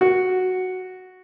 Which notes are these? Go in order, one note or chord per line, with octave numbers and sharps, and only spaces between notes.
F#4